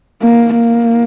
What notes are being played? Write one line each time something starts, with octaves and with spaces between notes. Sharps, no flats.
A#3
A#3